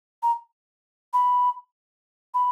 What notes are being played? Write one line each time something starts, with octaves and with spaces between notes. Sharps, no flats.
A#5
B5
B5